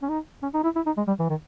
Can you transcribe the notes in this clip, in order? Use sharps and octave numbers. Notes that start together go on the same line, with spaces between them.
C#4
D#4
C#4
D#4
E4
E4
D#4
G#3
G3
E3
D#3